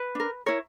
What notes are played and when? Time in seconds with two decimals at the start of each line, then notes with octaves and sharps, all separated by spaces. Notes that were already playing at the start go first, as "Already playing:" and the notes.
Already playing: B4
0.15 D4 A#4
0.46 E4 A#4 C#5